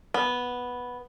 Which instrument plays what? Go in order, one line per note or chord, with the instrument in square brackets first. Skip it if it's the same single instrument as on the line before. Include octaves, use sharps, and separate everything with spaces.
[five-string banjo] B3